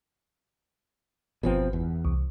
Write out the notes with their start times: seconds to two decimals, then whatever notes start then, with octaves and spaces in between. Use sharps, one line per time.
1.43 G1 B2 F3 C4 B4
1.73 E2
2.05 C2